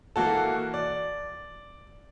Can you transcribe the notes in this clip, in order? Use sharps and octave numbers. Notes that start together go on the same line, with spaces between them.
E3 A#3 F#4 A4
D5